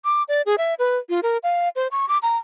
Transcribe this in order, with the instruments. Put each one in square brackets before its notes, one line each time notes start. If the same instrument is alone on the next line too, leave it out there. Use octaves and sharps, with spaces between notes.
[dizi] D6
D5
G#4
E5
B4
F4
A#4
F5
C5
C#6
D6
A#5